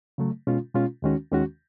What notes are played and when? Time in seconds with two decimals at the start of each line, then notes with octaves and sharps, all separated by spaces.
0.18 C#3 F#3 A3
0.47 B2 G#3 C#4 F4
0.74 B2 G#3 C#4 F4
1.02 D#2 D#3 G#3 C#4 F#4
1.31 D#2 D#3 G#3 C#4 F#4